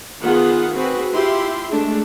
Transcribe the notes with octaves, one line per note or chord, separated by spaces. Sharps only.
D#3 B3 F4 G#4 F#5
C4 F#4 G#4 B4
E4 F4 G4 C6
G#3 A3 D4